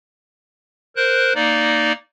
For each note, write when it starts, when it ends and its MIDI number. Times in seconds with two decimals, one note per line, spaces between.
0.96 1.33 70
0.96 1.33 72
0.96 1.33 90
1.35 1.92 58
1.35 1.92 63
1.35 1.92 74